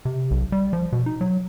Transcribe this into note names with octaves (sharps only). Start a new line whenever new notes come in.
C3
B1
G3
F3
B2
D#4
F#3